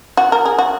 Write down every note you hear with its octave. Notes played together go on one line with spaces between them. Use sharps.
F#4
A#4
G#4
F#4